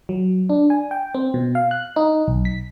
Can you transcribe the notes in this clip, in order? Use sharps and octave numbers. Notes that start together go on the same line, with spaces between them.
F#3
D4
G#5
G5
C4
B2
F5
F#6
D#4
B1
B6